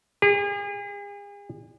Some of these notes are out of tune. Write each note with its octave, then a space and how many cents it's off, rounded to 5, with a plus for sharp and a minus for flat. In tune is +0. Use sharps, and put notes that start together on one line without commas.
G#4 -40